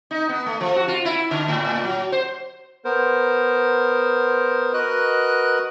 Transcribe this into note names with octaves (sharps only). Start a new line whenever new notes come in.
D#4
B3
A3
F3
F#4
F4
E4
D3
A2
A2
F#3
C5
B3 A#4 C5
F#4 A#4 B4 D#5 F#6